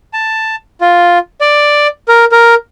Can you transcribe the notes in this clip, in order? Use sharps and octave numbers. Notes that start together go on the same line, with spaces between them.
A5
F4
D5
A#4
A#4